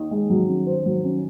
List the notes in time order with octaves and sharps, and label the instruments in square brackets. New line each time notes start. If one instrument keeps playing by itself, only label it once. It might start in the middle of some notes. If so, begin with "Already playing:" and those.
Already playing: [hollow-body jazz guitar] D#2 D#3
[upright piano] G#3
F#3
C#4
C5
F#3
C#4